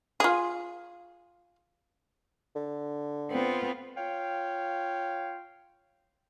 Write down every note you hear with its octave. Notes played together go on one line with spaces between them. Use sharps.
F4 G#4
D3
B3 C4 F4
F4 C#5 F5 G5